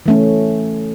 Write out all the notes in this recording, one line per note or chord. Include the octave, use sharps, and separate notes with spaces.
E3 A3 C#4